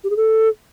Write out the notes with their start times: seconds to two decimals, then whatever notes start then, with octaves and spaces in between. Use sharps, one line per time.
0.04 G4
0.10 G#4
0.17 A4